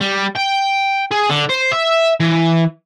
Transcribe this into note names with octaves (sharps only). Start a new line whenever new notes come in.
G3
G5
G#4
D3
C5
E5
E3